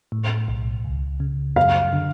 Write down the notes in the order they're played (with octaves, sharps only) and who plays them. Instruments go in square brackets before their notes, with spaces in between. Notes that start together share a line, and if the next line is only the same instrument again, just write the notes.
[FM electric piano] A2
B1
C#2
C#3
[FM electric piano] F#2 [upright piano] F5
[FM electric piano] D3